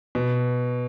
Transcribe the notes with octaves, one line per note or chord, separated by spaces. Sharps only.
B2